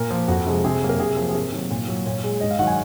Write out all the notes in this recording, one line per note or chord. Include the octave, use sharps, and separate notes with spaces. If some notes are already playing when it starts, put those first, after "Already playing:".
Already playing: A#2 A#4
F3 A#3
F2 F#4
C3 F3 G#3
C3 G#4
F#3 A#3
A#4
C3 G#4
F3 A#3
G#4
C3 A#4
D#3 F#3 A#3
A#2
F#3 A#3
A#2 C#5
G#3
G#2 D#5
F5
D#3 F#3 F#5
G#5